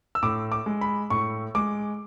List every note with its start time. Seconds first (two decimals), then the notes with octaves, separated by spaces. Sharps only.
0.15 E6
0.23 A2 D6
0.52 D6
0.66 G#3
0.81 B5
1.10 A2 C#6
1.55 G#3 D6